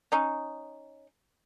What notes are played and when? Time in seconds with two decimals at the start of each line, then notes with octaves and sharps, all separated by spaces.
0.12 C#4 D#4